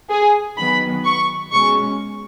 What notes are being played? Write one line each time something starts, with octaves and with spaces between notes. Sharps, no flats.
G#4
D#3 F#3 B3 B5
C#6
B2 G#3 C#4 C#6